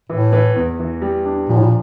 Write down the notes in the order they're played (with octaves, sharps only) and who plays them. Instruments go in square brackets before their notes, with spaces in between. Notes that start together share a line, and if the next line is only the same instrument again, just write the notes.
[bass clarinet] A2 [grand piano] E3
[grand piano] E3
E2
E3
G3
D4
[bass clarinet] A#2 [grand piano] F3
[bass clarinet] A2
A#2